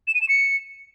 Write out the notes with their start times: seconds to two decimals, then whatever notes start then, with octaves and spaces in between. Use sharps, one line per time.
0.07 E7
0.15 D#7
0.22 E7
0.29 C#7